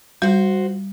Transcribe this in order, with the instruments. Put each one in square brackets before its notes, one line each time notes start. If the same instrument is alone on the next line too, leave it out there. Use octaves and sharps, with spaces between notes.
[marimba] G3 [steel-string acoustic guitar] F#4 C5